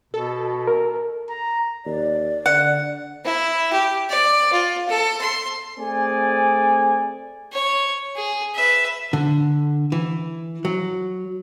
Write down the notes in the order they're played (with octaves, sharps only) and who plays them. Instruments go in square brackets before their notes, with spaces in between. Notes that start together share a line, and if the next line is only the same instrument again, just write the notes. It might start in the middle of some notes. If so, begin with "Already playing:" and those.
[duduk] B2 [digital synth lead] A4
[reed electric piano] A#4
[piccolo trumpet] A#5
[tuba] D#2 [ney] D5
[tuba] D3 [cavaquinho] F#5
[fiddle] E4
G4
D5
F4
A4
C6
[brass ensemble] A3 C4 G#4 D5 G#5
[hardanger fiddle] C#5
G#4
B4 E5
[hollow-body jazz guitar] D3
E3
F#3